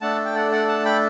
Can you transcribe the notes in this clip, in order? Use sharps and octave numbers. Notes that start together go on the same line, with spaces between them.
A3 D4 A4 F#5 A5
G5
D5 F#5
D5 F#5
F#5 A5
G5 B5